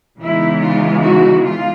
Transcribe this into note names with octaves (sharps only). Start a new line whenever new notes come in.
C#3 E3 G#3 B3 D#4 E4
F4
F#4
F4